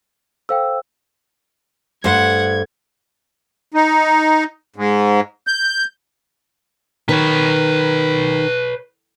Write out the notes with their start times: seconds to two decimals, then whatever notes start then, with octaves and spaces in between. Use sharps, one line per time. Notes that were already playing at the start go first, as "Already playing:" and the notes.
0.49 A4 C5 F5 G5 E6
2.04 G2 A3 C5 F#5 G#6
3.74 D#4
4.76 G#2
5.47 G6
7.09 D#3 B4 C#5